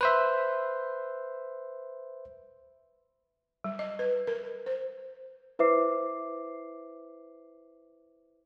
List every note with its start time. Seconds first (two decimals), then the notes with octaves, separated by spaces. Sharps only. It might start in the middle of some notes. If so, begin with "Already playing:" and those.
0.01 B4 C5 E5
3.64 G3
3.79 D#5
3.99 B4
4.27 A#4
4.66 C5
5.59 E4 B4 C5 E5 D6 C7